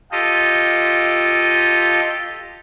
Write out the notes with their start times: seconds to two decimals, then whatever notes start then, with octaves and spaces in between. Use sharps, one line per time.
0.12 F4 G4 A4 D#5